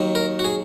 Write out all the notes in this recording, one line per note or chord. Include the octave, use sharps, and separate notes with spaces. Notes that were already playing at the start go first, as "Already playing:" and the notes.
Already playing: D#2 D#3 F#3
A#4
F#4
G#4